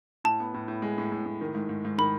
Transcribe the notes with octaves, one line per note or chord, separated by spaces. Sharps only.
A2 A5
B3
A2
A2
G#3
A2
A2
A2
D#3
G#2
G#2
G#2
D#3 B5